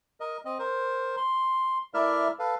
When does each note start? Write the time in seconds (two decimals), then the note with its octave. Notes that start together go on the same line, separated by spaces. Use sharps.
0.20 A#4 D#5
0.45 C4 D#5
0.59 A#4 C5
1.17 C6
1.94 A3 E4 A#4 D5 E5 F6
2.39 A4 B4 F5